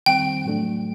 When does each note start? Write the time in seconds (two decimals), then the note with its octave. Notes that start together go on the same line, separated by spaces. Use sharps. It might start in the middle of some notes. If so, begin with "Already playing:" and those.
0.06 D#3 G3 C4 G5
0.45 A2 F#3 A3 D4